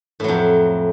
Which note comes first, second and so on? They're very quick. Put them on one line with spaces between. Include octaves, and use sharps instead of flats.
A2 F#3 F2